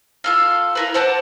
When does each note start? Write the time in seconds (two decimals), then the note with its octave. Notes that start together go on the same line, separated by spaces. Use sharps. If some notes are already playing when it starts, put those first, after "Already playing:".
0.24 F4 A4 F5
0.75 E4 A#4 B4
0.94 C5 F#5 A5 D6